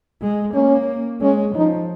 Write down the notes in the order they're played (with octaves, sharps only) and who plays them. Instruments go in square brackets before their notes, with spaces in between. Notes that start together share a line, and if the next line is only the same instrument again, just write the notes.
[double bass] G#3
[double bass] A#3 [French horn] C#4
[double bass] G#3 [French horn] C#4
[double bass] F3 [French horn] D#4